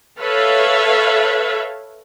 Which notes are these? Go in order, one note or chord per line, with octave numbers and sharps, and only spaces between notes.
A4 B4 C#5 E5 F5